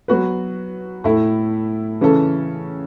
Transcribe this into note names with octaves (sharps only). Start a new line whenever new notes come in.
F#3 B3 F#4 B4
A2 A3 E4 A4
C#3 E3 C#4 A4